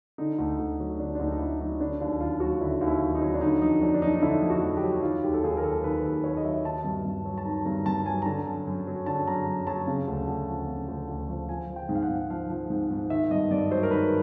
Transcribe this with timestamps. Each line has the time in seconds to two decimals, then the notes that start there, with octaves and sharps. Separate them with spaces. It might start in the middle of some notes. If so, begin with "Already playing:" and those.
0.18 D3 D#4
0.38 D2
0.59 D2
0.80 F#3
0.99 D3 D4
1.15 D4
1.19 D2 D#4
1.31 D#4
1.39 D2 E4
1.60 F#3 D#4
1.80 D3 D4
2.00 D#2 D4
2.20 D#2 F4
2.40 F#3 F#4
2.61 D3 E4
2.81 D#2
2.88 E4
3.02 D#2
3.15 D#4
3.21 F#3
3.34 D4
3.41 D3 D#4
3.62 F2 D#4
3.82 F2 D4
3.94 D4
4.02 F#3 D#4
4.15 D#4
4.22 D3 E4
4.42 F2
4.50 F#4
4.63 F2
4.77 G4
4.83 F#3
5.03 D#3 F4
5.24 D#2 G4
5.34 A4
5.43 D#2 G#4
5.57 A#4
5.63 F#3 A4
5.84 D#3 B4
6.05 D#2
6.24 D#2 C#5
6.37 D#5
6.44 F#3 E5
6.65 D#3 A5
6.84 G2
7.05 G2
7.25 F#3
7.38 A5
7.45 D#3 A#5
7.66 G2 A#5
7.86 G2 A5
8.06 F#3 G#5
8.22 A#5
8.26 D3 A5
8.46 F#2
8.67 F#2
8.87 F#3
9.06 D3 A5
9.27 F#2 A#5
9.47 F#2
9.67 F#3 A5
9.87 C#3
10.08 D2
10.27 D2
10.49 F3
10.69 C#3
10.88 D2
11.09 D2
11.29 F3
11.49 F3 G#5
11.70 F3
11.76 G5
11.89 G#2
11.95 F5
12.03 F#5
12.09 G#2
12.30 F3 F5
12.50 F3
12.70 G#2
12.90 G#2
13.10 D#3 E5
13.31 G2 D#5
13.51 G2 D5
13.71 F#3 C5
13.83 A#4
13.91 D#3 B4